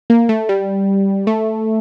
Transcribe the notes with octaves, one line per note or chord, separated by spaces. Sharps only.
A#3
A3
G3
A3